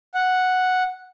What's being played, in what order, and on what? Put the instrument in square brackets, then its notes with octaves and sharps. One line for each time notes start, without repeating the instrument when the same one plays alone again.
[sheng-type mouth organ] F#5